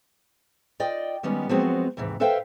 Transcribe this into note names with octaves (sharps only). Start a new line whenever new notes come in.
F4 D5 D#5 G5
D#3 G3 G#3 B3 C#4
F3 F#3 G#3 B3 C4 F#4
D#2 G#2 C3 E3
A4 B4 C5 E5 F5 G5